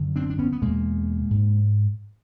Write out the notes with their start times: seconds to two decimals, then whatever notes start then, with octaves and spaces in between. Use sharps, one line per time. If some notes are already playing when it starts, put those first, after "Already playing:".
Already playing: F#2 D3
0.16 C4 D4
0.30 D4
0.39 B3 C#4
0.52 B3
0.62 E2 B2 G#3 A#3
1.31 G#2